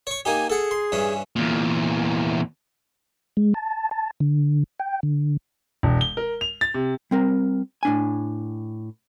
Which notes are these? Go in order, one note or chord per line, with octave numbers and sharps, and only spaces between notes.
C#5 C#6
A#3 D#4 G4 G#5
G#4 A4 F#5
C6
G2 E3 C#4
E2 A#2
G#3
A5
A5
D3
G5
D3
E1
G7
A#4
F7
A6
C3
G3 C4 A#4
A2 D4 G#5